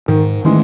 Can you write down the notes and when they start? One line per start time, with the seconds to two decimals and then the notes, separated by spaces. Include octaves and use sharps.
0.08 G#2 D#3
0.45 D#3 E3 G#3 A3 C#4